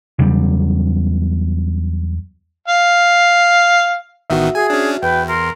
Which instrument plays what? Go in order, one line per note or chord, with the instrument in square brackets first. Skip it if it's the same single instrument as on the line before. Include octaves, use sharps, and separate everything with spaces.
[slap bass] E2 C#3 F#3 G3
[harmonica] F5
[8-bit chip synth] A1 D#3 B3 [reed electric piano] F#4 E5
[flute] G#4 [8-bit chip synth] G#5
[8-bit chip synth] C#4 D4
[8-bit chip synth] E2 [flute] B4 [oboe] G5
[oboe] A#4 [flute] C6